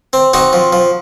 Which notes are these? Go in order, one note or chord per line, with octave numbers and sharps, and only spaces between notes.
C4
C4 D#4 F#4
F3
F3